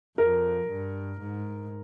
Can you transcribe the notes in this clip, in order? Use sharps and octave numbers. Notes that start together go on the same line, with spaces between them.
F2 A#4
G2
G#2